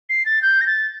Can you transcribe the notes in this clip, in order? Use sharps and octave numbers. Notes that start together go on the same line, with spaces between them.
C7
A6
G6
A#6
A6